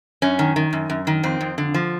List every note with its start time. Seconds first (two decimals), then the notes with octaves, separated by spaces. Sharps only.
0.22 F#2 C#4
0.39 D#3
0.56 D#3
0.73 F#2
0.90 F#2
1.07 D#3
1.23 F2 C4
1.41 F2
1.58 D3
1.74 F3